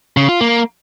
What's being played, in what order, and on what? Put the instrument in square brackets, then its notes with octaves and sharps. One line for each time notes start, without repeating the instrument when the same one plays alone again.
[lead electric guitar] C#3
F4
A#3